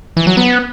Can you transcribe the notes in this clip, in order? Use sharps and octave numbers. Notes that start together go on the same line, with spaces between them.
E3
F#3
B3